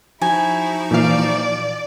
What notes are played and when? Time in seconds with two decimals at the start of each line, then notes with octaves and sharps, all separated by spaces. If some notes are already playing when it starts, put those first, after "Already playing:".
0.22 F3 D#4 E4 F#4 G#5
0.91 A#2 E3 D5 F5